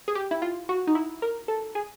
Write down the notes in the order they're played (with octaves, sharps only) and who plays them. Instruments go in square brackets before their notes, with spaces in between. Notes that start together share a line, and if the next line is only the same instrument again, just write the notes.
[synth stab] G#4
G4
E4
F4
F#4
D#4
E4
A#4
A4
G#4